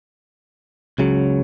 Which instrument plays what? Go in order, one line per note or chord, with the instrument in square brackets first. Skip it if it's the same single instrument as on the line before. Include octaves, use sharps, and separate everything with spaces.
[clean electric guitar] C#2 C#3 F#3